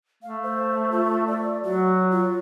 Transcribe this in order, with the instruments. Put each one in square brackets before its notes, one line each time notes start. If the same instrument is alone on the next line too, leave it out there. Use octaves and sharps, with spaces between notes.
[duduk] A3 [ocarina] F5
[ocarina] C5
F4
D5
[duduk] F#3 [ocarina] F#4
[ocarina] F4